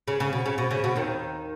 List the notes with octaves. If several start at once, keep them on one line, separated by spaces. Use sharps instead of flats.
C#3
C#3
B2
C#3
B2
C#3
B2
D#2 D#3